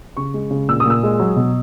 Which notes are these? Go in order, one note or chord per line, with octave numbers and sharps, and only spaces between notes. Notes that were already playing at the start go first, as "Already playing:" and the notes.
C#3 C#6
G#3
C#3
A#2 E6
D#6
A#2 E6
G#3
F#3
B2